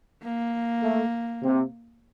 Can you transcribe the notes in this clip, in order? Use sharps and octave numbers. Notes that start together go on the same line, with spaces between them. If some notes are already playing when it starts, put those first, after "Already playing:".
A#3
A3
C3